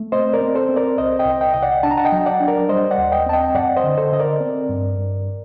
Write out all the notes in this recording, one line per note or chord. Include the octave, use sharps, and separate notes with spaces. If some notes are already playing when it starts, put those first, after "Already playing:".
Already playing: A3
C4 C5 D#5
A#4 D5
C4
A4 C5
C4
A#4 D5
C2 C5 D#5
D#5 G5
C2
D#5 G5
C2 D#5
D5 F#5
D4 A5
A#5
F#5 A5
D#5 G5
F#3
D5 F#5
D4
A#4 D5
G3 C5 D#5
D5 F#5
D#2
D#5 G5
C4 A5
D#5 G5
F#2 D5 F#5
C5 D#5
D3
A4 C5
D3 D#5
A#4 D5
C4
G2
G2